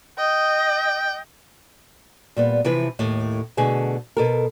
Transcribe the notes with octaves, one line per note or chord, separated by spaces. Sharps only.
D#5 G5
A#2 G3 B3
C3 E3 F3 E4 B4
D#2 A2
B2 D3 A3 G#4
B2 A4 A#4